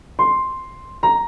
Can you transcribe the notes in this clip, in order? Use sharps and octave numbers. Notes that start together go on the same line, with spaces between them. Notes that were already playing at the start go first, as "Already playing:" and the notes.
C6
A#5